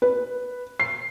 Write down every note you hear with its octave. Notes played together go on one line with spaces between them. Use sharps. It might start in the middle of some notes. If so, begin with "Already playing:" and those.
B4
C7